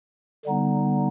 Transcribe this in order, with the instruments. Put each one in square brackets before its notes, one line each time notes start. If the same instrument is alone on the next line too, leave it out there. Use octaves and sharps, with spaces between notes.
[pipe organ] D3 G3 B3 D#4